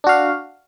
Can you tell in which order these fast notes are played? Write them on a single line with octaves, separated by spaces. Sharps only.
D4 F#4 F5